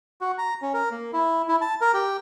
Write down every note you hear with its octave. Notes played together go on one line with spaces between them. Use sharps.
F#4
A#5
C#4
A#4
A#3
E4
E4
A5
A#4
G4